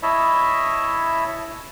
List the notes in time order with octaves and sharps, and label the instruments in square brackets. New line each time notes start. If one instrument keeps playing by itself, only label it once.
[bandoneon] E4 C#5 D#5 E5 A5 B5